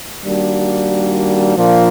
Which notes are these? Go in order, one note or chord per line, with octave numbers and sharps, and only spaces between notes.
D#3 G3 A#3 D4 F#4
A#2 F3 A#3 D4 F4